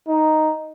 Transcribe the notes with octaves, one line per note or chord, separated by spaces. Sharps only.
D#4